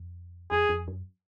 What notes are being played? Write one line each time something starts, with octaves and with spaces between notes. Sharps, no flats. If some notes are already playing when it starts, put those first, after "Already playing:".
Already playing: F2
F2 G#4
F2
F#2